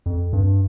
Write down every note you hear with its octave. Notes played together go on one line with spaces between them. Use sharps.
F2
G2